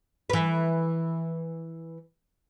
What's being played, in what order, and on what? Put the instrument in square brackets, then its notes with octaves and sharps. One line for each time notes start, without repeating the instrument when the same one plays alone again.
[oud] E3 B4